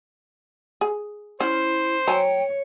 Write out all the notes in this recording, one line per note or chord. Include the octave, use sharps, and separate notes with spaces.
G#4
C#4 E4 C5
F#3 C#5 G5 G#5 A#5